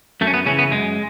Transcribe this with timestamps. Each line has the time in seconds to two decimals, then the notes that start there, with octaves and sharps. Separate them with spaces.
0.21 F#2 A3
0.27 C#4
0.34 B3
0.46 C#3 E3 C#4
0.59 B3
0.71 F#2 G#3